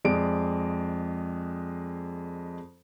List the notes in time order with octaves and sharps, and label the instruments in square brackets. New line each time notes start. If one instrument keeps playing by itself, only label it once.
[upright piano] F2 G#3 D5 D7